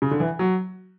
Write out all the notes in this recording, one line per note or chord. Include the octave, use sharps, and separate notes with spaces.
C#3
D3
E3
F#3